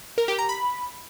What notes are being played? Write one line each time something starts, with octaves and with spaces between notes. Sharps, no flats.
A#4
G4
A#5
B5